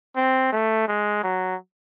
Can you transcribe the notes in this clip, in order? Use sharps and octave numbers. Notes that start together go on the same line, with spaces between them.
C4
A3
G#3
F#3